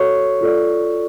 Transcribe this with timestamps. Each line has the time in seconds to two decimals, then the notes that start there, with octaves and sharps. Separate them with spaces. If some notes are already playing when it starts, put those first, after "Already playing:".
Already playing: F#4 A4 C#5 C#6
0.41 F4 A4 D5